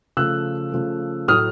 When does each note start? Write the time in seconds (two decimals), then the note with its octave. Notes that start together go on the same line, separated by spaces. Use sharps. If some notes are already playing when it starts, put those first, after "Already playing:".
0.17 C#3 F3 A3 E6 F#6
0.72 C#3 F3 A3
1.28 A2 F#3 A3 D#6 F6